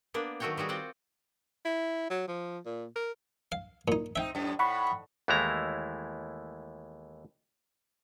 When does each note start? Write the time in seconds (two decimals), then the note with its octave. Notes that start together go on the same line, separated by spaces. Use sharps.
0.14 A#3 B3 D4
0.40 D#3 F#3 A3 F#4 C#5 G5
0.57 G3 B3 F#4 G#4
0.69 C4 F4 F#4 D5 F#5 G5
1.65 E4
2.10 F#3
2.28 F3
2.65 A#2
2.96 A#4
3.52 F5
3.88 A#2 D#4
4.16 C4 D#4 E5 G5
4.35 F#2 A2
4.59 A2 F#5 B5 C#6
5.28 D#2 E3 G#3 A3 E4 A#5